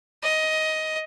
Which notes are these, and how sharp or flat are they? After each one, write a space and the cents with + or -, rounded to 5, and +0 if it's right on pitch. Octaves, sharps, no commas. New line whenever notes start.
D#5 +15